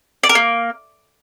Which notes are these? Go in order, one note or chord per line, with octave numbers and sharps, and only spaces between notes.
D5
A#4
A#3